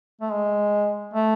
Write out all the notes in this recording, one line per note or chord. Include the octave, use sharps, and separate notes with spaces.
A3
G#3
A3